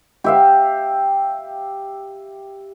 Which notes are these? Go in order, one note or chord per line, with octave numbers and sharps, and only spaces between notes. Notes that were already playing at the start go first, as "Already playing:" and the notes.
G4 E5 F5